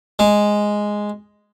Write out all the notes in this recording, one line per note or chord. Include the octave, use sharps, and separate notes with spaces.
G#3